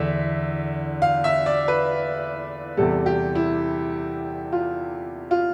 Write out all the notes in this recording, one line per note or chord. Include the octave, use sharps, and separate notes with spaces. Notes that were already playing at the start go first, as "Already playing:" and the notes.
Already playing: E2 D3 E5
F5
E5
D5
B4
E2 C3 G3 A4
G4
E4
F4
F4